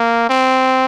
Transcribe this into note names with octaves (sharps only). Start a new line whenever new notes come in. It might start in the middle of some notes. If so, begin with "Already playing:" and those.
Already playing: A#3
C4